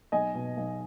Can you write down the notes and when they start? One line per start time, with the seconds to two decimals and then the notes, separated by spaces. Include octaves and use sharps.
0.12 B1 D#5 G#5
0.35 B2
0.57 B1